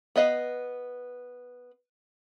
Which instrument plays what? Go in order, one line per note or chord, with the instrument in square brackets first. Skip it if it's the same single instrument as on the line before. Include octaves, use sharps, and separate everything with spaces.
[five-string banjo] B3 B4 D#5 F5